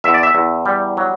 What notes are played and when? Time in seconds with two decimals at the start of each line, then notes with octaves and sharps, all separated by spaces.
0.04 E2 E5
0.14 D5
0.23 E5
0.35 E2
0.66 G3
0.97 F#3